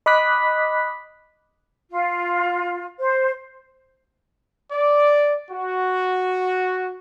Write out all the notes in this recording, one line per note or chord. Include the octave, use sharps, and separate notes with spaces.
D#5 B5 D6 D#6 F#6 B6
F4
C5
D5
F#4